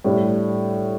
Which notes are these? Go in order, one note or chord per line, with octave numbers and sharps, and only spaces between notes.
A2 G3 D4